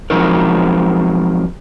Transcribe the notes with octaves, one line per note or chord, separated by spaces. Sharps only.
F3 F#3 G#3 C4 D#4 A#4